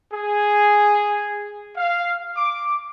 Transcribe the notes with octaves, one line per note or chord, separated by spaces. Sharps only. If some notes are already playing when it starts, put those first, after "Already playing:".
G#4
F5
D6